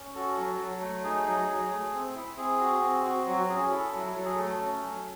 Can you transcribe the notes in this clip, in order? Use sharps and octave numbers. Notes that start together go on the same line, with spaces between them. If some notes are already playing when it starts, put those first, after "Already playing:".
Already playing: C#4
F#4 A4
F#3
F#3
A3
D#4 G#4
F#3
F#3
A3
C4
E4
C4 G#4
F#4
C4
F#4
F#3 F#4
C#4 G#4
E4 A4
F#3
F#3 A4
G#4
A3 A4
C#4
F#3